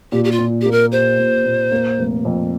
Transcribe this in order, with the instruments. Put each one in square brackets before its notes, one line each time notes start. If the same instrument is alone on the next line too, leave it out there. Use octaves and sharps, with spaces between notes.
[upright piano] A#2 [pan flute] G4
[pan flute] G4
F4
[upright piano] A#2
[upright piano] A#3 [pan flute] G4
[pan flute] A#4
[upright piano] G4 [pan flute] C5
[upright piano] A#2
A#2
A#3
F1
F2